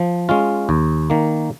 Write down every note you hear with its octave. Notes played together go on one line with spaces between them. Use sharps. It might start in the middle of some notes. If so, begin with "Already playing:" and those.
Already playing: F3
G#3 C#4 F4
D#2
D#3 A#3